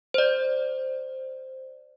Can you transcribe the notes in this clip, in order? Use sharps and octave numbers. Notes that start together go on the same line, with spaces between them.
C5 D5